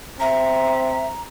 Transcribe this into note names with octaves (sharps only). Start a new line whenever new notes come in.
C4 E5 A#5